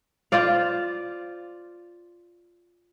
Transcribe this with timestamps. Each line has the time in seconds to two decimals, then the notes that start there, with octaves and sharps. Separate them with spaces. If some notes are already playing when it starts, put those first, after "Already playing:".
0.32 F4 C5 D5 F5